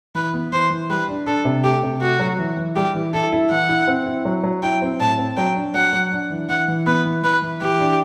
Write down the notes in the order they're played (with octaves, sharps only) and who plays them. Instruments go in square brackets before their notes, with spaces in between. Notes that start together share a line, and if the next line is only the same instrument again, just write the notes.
[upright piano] E3 [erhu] B4
[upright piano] B3
[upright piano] E3 [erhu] C5
[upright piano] E3
[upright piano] G3 [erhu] B4
[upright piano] D4
[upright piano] D4 [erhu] A4
[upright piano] C3
[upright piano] A3 [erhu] G4
[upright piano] C3
[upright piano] A3 [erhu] F#4
[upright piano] F#3
E3
E3
[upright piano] G3 [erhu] G4
[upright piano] E3
[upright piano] E4 [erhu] A4
[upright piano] E4
[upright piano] E3 [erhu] F#5
[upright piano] E4
C4
E4
F#3
F#3
[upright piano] E4 [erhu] G5
[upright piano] C4
[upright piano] A2 [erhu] A5
[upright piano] C4
[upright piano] F#3 [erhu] G5
[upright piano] D4
[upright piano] F#3 [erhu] F#5
[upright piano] F#3
D4
E3
[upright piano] E3 [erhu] F#5
[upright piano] E3
[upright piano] B3 [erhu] B4
[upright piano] E3
[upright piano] E3 [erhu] B4
[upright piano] E3
[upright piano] E3 [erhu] G4
[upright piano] D4